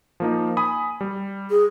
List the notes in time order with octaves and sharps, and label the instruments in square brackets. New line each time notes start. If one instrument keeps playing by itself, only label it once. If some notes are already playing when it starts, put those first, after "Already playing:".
[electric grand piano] F3 A#3 D#4
G#5 B5 D#6
G3
[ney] G#4